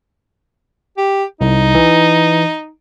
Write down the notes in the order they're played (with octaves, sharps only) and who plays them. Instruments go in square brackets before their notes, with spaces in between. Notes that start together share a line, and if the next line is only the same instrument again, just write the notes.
[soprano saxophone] G4
[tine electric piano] C2 [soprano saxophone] D#4
[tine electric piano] E3